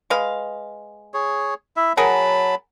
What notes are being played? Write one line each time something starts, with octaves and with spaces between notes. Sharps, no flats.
G#3 B4 F5
G#4 C#5
E4 E5
F#3 G#4 A#4 F#5 A5 B5